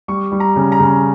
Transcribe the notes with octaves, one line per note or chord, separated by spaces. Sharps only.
G3 C#6
G3
A#5
C#3
A#5
C#3